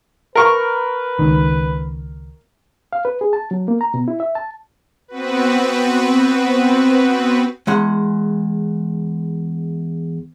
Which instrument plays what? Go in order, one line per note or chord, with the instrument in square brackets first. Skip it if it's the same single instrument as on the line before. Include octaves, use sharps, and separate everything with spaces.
[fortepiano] A#4 C#6 [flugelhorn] B4
[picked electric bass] C#2 D#3
[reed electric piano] F5
B4
G#4
A5
F#3
A#3
A#5
B2
E4
E5
A5
[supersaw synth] B3 C4 F#4 B4
[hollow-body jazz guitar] E2 G#3 F#5